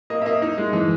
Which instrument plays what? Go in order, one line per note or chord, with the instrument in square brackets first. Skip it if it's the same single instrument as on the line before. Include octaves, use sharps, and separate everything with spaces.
[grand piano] A#3 D#5
E5
A#3 D#5
D#4
G#3
E3